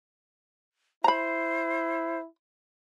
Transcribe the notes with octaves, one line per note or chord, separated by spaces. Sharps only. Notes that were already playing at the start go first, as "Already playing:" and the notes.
E4 C5 A#5 B5